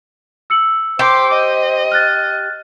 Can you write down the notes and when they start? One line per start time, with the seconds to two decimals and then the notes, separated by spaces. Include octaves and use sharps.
0.50 E6 C#7 F#7
0.99 G4 C5 C6 D6
1.34 D#5
1.92 F6 F#6 A6